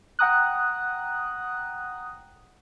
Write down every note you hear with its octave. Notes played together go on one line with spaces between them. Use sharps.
F#5 G5 A#5 D#6 F#6